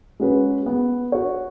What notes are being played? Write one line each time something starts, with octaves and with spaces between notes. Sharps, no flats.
G#3 C#4 F#4 B4
B3
F#4 C#5